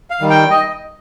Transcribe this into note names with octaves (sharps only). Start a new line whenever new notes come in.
F5
D#3 G3
G5
D#5